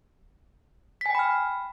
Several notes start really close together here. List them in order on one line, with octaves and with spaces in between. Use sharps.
B6 G#5 G5 B5 F6